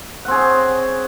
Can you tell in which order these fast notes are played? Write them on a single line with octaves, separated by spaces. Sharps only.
F#5 C4 G#4 C#5